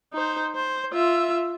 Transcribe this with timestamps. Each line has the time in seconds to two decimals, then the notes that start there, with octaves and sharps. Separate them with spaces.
0.13 D#4 C5
0.56 C5
0.93 F4 E5